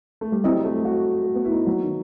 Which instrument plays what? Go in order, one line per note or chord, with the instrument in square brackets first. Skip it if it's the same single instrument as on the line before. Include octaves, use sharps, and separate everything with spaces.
[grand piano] A3
G3
[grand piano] F#3 [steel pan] C4 E4 G4 D#5
[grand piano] A3
F#4
A3
B3
E4
D#4
F#3
D#3